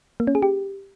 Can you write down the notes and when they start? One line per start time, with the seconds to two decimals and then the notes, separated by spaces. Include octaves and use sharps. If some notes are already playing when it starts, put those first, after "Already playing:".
0.20 A#3
0.27 C#4
0.35 G#4
0.42 G4